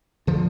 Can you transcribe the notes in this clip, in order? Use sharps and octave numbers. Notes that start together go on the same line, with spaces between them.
D3 F3